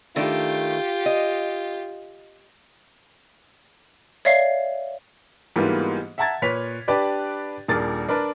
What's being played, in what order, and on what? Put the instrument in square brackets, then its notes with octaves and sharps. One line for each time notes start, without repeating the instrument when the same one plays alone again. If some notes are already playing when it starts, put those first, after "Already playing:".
[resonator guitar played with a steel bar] D#3 A3 D4 [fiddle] F4 G4
[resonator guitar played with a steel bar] D#5
[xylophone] C#5 D5 E5 F5 C7
[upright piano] G#2 E3 G3 A#3 B3 F4
E5 F#5 A5 A#5 G#6 A6
A#2 B4 C#5 B6 F7
D4 G4 B4 D5
D#1 A#2 D4 G#4 A#4 A6
D4 A#4 B4